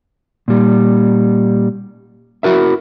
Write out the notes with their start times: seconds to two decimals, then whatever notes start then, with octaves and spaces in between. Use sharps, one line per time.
0.48 A#2 G3
2.43 E4 F#4 A#4 E5